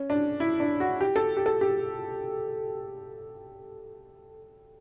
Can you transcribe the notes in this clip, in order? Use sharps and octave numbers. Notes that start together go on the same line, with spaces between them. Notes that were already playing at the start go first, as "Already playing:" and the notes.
Already playing: C#4
D4
E4
D4
F#4
G4
A4
G4
A4
G4